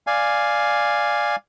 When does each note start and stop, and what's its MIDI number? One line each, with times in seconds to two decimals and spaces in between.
0.07 1.36 74
0.07 1.36 77
0.07 1.36 80